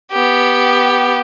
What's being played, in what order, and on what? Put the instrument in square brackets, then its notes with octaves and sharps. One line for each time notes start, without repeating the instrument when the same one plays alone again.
[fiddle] B3 G4